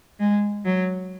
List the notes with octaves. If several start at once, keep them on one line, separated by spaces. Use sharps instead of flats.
G#3
F#3